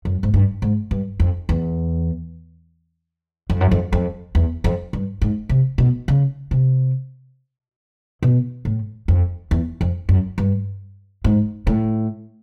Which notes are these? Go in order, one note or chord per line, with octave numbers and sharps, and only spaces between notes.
F#2
G#2
G2
G#2
G2
F2
E2
F2
F#2
F2
F2
E2
F2
G2
G#2
C3
B2
C#3
C3
B2
A2
F2
E2
F2
F#2
G2
G#2
A2